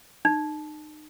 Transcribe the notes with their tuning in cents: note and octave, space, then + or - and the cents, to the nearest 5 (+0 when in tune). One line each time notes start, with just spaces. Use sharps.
D#4 -30